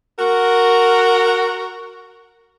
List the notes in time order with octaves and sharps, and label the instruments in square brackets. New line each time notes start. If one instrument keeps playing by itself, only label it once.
[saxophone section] F#4 A#4